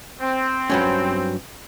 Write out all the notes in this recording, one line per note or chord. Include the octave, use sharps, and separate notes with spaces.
C4
G2 F#3 C#4